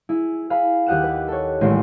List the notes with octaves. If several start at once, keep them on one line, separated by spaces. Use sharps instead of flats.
E4 G#4
G#4 F5 B5
D#2 G4 D#5 F#5 F6 E7
B4
A4 C#5
D#1 A1 G#3 C6